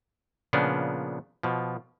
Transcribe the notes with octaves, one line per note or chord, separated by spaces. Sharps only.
A#2 C#3 F3 B3 D4
B2 F3